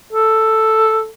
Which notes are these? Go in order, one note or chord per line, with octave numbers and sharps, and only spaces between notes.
A4